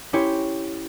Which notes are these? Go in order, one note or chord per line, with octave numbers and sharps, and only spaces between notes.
C#4 E4 G4 C5 C#5